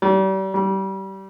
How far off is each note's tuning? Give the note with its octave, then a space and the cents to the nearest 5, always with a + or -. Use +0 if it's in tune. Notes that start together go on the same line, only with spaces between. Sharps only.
G3 -35
G3 -25